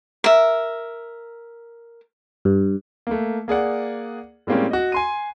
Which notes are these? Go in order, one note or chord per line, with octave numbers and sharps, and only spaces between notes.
A#4 E5
G2
A3 A#3
A#3 G#4 D5 F#5
A2 G3 G#3 A#3 C4 C#4
F#4 D#5
G#5 C6 D#7